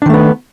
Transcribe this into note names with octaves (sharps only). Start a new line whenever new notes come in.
D#3 A3 B3 D4